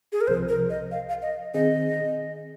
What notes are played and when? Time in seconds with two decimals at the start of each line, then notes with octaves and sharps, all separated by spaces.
0.12 G#4
0.21 A#4
0.27 C2 C3 F3 C5
0.49 A#4
0.70 D#5
0.91 F5
1.09 F5
1.22 D#5
1.54 D#3 C4 G#4 D#5